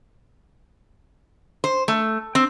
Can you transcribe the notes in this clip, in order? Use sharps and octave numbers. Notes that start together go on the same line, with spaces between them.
C5
A3
C4